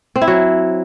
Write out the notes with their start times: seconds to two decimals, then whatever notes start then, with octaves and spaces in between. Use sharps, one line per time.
0.16 C4
0.22 E4
0.28 F#3